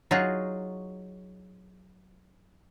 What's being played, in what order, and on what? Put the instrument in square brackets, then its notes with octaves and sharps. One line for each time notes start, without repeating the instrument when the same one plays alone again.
[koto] F#3 D#4 F4 F#4 G#4